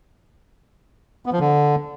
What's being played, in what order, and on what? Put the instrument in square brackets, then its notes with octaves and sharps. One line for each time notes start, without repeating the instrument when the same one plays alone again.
[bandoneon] B3
F3
D3